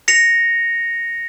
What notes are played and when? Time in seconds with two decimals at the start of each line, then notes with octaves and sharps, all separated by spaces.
0.08 A#6 C#7 F7